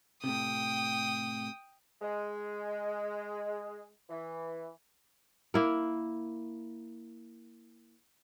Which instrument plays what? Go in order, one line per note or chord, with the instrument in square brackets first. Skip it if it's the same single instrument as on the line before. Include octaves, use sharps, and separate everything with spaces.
[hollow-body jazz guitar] A2 C3 [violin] G5 D#6
[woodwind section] G#3
E3
[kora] A#3 E4 A#4